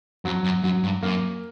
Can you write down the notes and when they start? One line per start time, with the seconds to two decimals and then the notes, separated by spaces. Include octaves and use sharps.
0.25 F2 F#3
0.44 F#2
0.63 F#2 F#3
0.83 G2
1.02 F#2 A#3